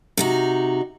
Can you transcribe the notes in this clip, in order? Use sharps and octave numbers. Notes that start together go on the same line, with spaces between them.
C3 D#4 F#4